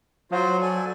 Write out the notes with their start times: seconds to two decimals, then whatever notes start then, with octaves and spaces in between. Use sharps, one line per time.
0.32 F#3 F4 F#4 C5
0.61 A4 D5 G#5